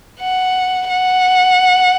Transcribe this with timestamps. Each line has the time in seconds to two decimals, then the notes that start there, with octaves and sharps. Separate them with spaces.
0.20 F#5
0.89 F#5